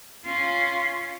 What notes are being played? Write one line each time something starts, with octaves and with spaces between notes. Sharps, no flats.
C#4 F4